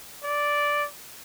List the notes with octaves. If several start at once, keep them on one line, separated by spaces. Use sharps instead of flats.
D5